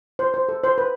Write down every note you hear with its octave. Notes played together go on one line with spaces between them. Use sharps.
C5
C5
A4
C5
B4